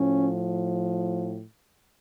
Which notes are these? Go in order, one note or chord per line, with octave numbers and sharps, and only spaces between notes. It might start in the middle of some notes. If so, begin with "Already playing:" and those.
Already playing: A2 F3 C#4